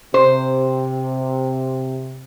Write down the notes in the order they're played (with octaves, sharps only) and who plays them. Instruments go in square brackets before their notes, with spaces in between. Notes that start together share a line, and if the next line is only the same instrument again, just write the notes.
[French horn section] C3 [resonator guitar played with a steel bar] C5